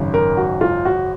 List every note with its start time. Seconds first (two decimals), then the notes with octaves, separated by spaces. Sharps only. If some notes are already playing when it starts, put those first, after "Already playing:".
Already playing: G#1 F#2 C#3
0.14 A#4
0.37 F#4
0.61 F4
0.85 F#4